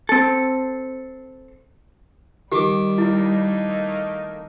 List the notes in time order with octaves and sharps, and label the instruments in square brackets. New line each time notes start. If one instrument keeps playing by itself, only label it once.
[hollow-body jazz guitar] C4 A4
[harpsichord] D#3 D6 [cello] G3 [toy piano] G4
[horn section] A3 A#3 D#4 [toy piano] E4